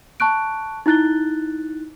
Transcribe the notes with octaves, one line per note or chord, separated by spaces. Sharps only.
A5 C#6 F#6 D7
D#4 E4 F#6 A6 G7